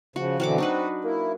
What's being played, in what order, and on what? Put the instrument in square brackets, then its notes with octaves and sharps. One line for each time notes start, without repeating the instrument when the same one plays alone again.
[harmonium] C#3 F3 [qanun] F#4
[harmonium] B2 D3 E3 [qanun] F#3 F#4 D6 [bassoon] C4
[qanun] D4 D#4 B4 [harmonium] F#4
[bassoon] A#3 [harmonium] E4